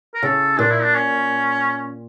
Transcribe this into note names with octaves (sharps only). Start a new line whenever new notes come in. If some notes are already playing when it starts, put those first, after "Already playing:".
A#4
C#3 A4
A#2 D4
E4
D4
C#4